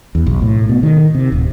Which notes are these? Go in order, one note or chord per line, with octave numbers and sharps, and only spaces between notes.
E2
B1
A2
B2
D#3
C3
D1